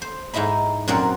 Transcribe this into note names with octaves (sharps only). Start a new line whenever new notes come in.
C5
G#2 D#4 E4 D#5 B5
F#2 A#2 C4 A#4 D5 F#5